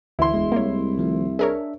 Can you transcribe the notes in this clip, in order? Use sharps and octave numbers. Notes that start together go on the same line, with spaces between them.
D2 E3 E4 C6
E1 G#3
C2 A#3 C#5
D#3 F3 A3
D4 G#4 A#4 C#5 E5